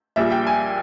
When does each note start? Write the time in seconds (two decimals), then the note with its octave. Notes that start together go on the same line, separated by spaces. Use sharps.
0.16 A#1 A#2 G3 E5
0.31 G5
0.47 G#5